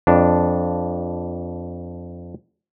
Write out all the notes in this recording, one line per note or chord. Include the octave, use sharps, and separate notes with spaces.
F2 D4